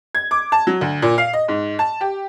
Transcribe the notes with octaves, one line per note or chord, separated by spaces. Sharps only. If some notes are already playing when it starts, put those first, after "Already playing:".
G#6
D6
A5
F#3
D2
A#2
F5
D#5
G#2
A5
G4